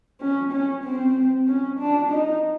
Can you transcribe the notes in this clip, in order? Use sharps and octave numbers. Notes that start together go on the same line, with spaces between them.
C#4
C#4
C4
C#4
D4
D#4